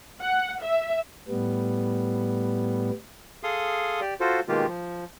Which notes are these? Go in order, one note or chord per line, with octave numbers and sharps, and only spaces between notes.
F#5
E5
A2 G3 B3
G#4 A4 F5 C6 D#6
G4 D5
F4 F#4 A4 C5
B2 D#3 G#3 A#3 F4 G4
F3